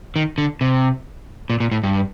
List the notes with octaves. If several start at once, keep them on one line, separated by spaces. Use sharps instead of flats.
D#3
D3
C3
A#2
A#2
A2
G2